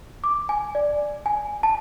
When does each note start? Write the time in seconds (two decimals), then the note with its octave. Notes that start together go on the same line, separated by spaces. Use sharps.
0.24 D6
0.49 G#5
0.75 D5
1.26 G#5
1.63 A5